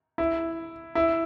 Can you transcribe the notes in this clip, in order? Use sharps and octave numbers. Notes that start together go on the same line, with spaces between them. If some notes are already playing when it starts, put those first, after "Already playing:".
E4
E4